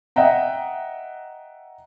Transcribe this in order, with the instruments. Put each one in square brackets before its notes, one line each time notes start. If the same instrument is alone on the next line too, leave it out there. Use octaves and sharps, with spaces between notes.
[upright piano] D#5 E5 F#5 G5 A#5